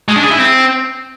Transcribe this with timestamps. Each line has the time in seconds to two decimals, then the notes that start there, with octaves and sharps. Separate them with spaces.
0.09 G#3
0.16 D4
0.24 G#4
0.31 E4
0.39 C4